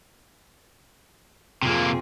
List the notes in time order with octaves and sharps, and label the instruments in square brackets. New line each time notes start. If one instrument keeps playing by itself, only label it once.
[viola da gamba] F2 C4 G#4 [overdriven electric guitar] C3 A#3